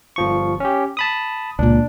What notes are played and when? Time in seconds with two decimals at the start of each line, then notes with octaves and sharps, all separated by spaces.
0.16 G1 F3 C#6
0.60 C#4 G4
0.97 A5 B5 D#6
1.59 C#2 A#2 D4